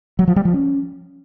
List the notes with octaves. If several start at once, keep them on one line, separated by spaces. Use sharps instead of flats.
F#3
F3
G3
F3
C#4